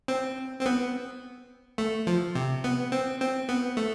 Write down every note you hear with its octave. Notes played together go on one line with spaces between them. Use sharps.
C4
C4
B3
A3
F3
C3
B3
C4
C4
B3
A3